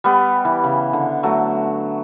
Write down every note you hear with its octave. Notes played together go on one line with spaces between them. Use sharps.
G3 B3
E3
C#3
D3
F#3 A3